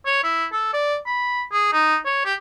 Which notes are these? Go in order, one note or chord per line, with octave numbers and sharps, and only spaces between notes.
C#5
E4
A4
D5
B5
G#4
D#4
C#5
G4